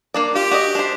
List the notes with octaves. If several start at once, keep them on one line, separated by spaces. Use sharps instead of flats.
A#3 D4 D5
F4 G4
F#4 D5 D#5
D4 C5